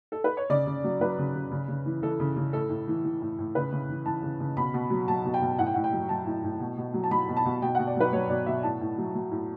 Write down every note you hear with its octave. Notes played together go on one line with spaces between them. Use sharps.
A4
B4
C#5
C#3 D5
C#3
F#3
F#3 B4
C#3
C#3
C#3
C#3
E3
E3 A4
C#3
C#3
A2 A4
A2
E3
E3
A2
A2
C#3 B4
C#3
E3
E3 A5
C#3
C#3
B2 B5
B2
F#3
F#3 A5
B2
G5
B2
A2 F#5
G5
A2 F#5
G5
F#3
F#3 A5
A2
A2
B2
B2
F#3
A5
F#3 B5
B2
A5
B2
B2 G5
B2 F#5
D5
F#3 B4
F#3 C#5
B2 D5
B2 E5
A2 A5
A2
F#3
F#3
A2